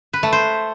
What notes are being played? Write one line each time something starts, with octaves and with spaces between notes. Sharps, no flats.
B4
A3
C5